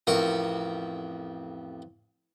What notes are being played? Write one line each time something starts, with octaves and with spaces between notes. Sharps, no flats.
A1 F2 A#4 C#6